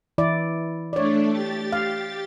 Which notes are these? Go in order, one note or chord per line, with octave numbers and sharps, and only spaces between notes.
E3 E4 D5
A3 D4 C#5 D5
G4 A6
F5